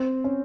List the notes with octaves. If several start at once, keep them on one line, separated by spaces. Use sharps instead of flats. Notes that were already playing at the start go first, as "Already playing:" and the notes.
Already playing: C4
C#4